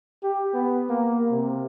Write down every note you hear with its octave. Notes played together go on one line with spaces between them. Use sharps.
G4
B3
A#3
C3